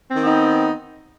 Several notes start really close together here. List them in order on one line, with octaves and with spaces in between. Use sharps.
C4 D#3 B3 D#4